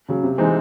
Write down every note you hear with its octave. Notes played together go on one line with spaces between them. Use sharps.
C#3 F#3
C3
E3 G#3 C4 D#4